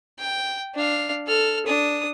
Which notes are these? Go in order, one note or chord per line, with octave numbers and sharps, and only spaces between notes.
G5
D4 F5
A4 F6
D4 D#6